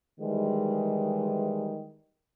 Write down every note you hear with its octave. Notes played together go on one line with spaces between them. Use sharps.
D#3 E3 G3 G#3